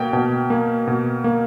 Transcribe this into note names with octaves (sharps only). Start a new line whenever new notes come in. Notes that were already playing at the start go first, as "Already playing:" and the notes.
Already playing: B2 A#3 G5
B2
A#3
B2
A#3